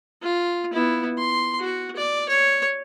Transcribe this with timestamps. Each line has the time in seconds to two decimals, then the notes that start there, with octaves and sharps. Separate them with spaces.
0.22 F4
0.73 B3 E4
1.18 C6
1.60 F#4
1.96 D5
2.29 C#5